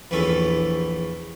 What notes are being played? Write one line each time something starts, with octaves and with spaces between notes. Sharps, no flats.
A#1 E2 E3 C#4 A4